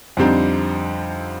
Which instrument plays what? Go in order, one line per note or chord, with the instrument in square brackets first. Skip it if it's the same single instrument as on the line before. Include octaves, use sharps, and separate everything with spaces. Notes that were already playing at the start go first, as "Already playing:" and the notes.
[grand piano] F2 D3 G3 C4 D#4